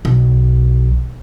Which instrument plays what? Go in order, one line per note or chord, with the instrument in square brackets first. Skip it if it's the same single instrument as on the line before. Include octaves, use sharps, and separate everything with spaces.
[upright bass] B1